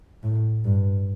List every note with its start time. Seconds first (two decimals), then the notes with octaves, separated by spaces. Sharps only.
0.23 A2
0.65 G2